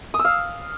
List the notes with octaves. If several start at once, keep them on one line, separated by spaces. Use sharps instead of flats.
D#6
E6
F5